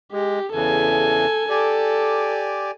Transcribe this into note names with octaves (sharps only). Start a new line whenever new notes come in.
G#3 G4
E2 C#3 E3 A4 G#5
G4 A4 D5 G#5